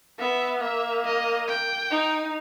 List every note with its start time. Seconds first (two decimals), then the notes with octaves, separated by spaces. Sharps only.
0.19 B3 E5
0.61 A#3 E5
1.05 D#5
1.48 G5
1.91 D#4